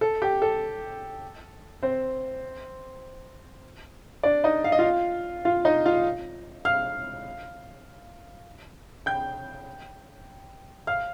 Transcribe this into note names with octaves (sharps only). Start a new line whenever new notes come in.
A4
G4
A4
C4 C5
D4 D5
D#4 D#5
F5
D#5
F4 F5
F4 F5
D#4 D#5
F4 F5
F5 F6
G5 G6
F5 F6